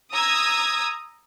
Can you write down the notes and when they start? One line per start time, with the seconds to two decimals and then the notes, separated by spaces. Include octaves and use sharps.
0.13 A#5 D#6 E6 G#6